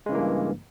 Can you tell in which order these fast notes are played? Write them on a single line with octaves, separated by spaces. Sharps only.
G#3 C#3 E3 A#3 G2